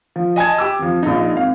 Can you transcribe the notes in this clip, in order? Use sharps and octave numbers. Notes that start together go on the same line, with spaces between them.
F3
D#5 G#5 A5 G#6
G4 D6 E6
F2 F3
A#1 D#4
G#1 F5